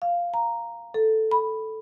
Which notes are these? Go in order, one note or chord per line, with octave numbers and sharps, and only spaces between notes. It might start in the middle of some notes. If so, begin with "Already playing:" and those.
F5
A#5
A4
B5